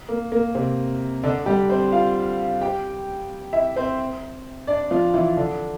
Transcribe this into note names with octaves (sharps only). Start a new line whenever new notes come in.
A#3
A#3
C3 C4
D3 D4
G3 G4
C4 C5
F4 F5
G4 G5
E4 E5
C4 C5
D4 D5
F3 F4
E3 E4
D3 D4